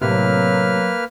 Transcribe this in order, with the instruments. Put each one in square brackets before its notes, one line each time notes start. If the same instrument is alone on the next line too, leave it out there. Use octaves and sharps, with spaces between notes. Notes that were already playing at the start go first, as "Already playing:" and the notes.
[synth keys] A2 C3 [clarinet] F#3 [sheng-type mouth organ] A#3 B4 F6